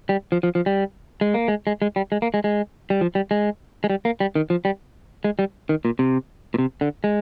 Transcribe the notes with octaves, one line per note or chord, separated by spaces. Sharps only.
G3
F3
F3
F3
G3
G#3
A#3
G#3
G#3
G#3
G3
G#3
A#3
G#3
G#3
G3
F3
G3
G#3
G#3
G3
A#3
G3
D#3
F3
G3
G#3
G3
D#3
A#2
C3
A#2
C3
D3
G#3